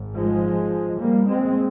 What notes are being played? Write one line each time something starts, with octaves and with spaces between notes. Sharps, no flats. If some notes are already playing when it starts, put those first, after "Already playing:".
Already playing: G#1 G#2
F3 G#3
G3 A#3
G#3 C4